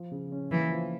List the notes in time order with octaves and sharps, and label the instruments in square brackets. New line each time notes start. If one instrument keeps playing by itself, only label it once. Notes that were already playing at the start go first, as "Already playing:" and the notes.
Already playing: [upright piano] F3
C#3
C#4
[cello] E3 [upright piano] A#3
[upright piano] F3